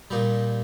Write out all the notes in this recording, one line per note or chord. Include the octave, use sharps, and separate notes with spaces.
A#2 G3 D#4